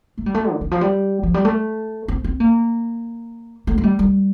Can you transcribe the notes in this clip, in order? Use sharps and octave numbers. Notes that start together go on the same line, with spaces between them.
A3
G3
A3
D3
D#3
F3
G3
F3
G3
A3
C4
C4
A#3
A3
A3
G3
G3